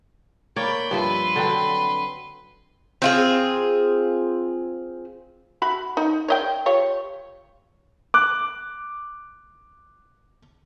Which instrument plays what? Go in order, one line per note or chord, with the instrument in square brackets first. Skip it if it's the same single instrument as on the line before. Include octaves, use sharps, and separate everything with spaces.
[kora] A#3 C#5 D5 [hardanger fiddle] G5 B5
[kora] G2 F3 E5 [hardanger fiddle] B4 C6
[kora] D3 F#3 C4
[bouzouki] C4 F4 G#4
[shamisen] F#4 E5 B5
D#4
C#5 D#5 G5
F4 G4 C#5
[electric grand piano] D6 F#6